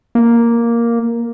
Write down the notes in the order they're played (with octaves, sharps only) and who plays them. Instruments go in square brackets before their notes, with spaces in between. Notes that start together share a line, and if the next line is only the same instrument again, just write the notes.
[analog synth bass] A#3